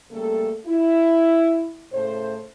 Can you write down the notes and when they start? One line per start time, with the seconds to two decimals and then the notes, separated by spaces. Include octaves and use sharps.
0.11 C#3 G3 A3 A#3 A4
0.67 E4
1.93 A2 C#3 A3 C5